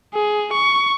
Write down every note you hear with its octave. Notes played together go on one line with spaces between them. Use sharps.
G#4
C#6